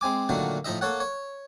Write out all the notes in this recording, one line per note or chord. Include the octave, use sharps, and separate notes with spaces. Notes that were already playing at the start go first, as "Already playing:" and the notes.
G#3 C4 G#5 D6
A#2 D3 D#3 F#3 A3 A#3
A2 F3 D#4 D#5 E5
A#3 A4 C#5 F#5
C#5